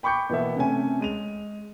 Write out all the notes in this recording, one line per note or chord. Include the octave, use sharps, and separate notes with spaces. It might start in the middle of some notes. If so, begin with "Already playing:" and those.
G5 B5 C#6 D6 G6 C#7
B2 E3 A#3 B3 E5
C3 A3 C#4 G#5
G#3 D#7 F7